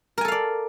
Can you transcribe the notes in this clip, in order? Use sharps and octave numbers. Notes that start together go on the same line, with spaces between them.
A4 A#4 D5 F5 G#5